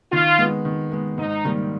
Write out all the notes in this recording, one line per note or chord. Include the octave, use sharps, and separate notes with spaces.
D#3 F4
G#3 B3
D#3
G#3 B3
G#2 D#4
D#3 G3 A#3